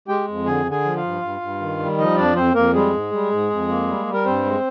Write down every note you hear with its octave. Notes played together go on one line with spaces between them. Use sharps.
G#3 G4 G5
F2
D3 G#4 G#5
D3
G#4 G#5
F3
F4 F5
G2
G2
G2
D#3
G3
F3 D#4 D#5
F2 D4 D5
F2 C4 C5
F2 A#3 A#4
G3 G#3 G#4
G#2
G3
G#2
F2
A#3
G3
G3
A#4
G2 C4 C5
G#3